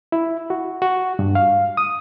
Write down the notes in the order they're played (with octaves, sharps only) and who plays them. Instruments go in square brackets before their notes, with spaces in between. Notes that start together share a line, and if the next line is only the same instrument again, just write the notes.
[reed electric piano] E4
F#4
F#4
G2
F5
D#6